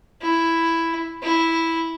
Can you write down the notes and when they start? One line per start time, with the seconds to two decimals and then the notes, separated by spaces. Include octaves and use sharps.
0.22 E4
1.23 E4